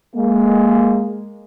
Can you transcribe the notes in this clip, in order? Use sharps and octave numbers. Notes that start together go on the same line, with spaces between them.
G#3 A#3